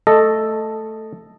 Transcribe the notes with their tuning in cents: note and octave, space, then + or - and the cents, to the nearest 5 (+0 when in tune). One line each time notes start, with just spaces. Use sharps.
A3 +0 A4 +0 D#5 -5